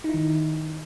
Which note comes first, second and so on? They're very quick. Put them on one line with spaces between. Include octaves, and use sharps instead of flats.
D#4 E4 D#3